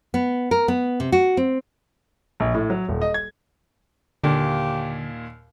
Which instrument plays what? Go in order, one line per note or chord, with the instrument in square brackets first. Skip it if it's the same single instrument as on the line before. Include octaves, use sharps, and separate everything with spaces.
[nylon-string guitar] B3
A#4
B3
C3
F#4
C4
[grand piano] A#1
A2
F#3
D#1
D#5
G#6
[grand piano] D#2 A#2 [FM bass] D3 [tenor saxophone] G4